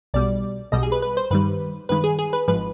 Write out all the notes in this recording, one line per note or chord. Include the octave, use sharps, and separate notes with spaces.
B1 B2 G3 D5
B1 B2 G3 D#5
G#4
B4
B4
C5
G2 D#3 G3 B4
G2 D#3 G#3 B4
G#4
G#4
B4
G#1 G#2 F3 B4